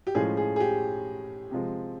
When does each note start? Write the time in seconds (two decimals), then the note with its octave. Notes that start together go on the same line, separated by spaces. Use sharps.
0.07 G4
0.15 A2 F3 G#3 C#4 G#4
0.37 G#4
0.56 G#4
0.60 G4
1.51 C3 F3 G#3